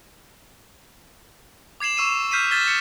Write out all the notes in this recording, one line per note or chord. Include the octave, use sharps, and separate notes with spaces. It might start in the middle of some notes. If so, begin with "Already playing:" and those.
D6 G#6 C7 E7 F#7
C#6 E6 C7 D#7 E7
D#7
F6 G6 B6 C7 D#7
F6 G#6 A6 B6 G7
A6 C#7